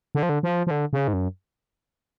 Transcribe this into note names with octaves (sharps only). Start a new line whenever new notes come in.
D3
F3
D3
F3
F3
D3
C#3
G#2
F#2